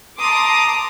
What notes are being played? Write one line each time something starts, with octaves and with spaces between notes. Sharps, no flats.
A5 A#5 C6 D6 D#6